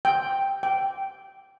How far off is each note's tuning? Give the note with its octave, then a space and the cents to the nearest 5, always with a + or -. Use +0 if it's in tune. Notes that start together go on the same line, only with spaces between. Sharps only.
G5 +5
G5 -10